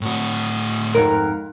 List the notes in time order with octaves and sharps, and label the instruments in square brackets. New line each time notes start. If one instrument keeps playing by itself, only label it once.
[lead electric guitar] A2 F#4
[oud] F2 G#2 A#4